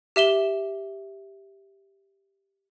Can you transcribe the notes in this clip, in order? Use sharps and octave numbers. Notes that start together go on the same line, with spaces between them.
G4 E5 E7 G7